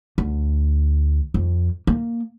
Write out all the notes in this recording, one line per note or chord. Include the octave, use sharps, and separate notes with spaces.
D2
F2
A#3